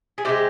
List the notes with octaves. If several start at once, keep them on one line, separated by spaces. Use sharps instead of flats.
G#4
C3 E3 G#3 G4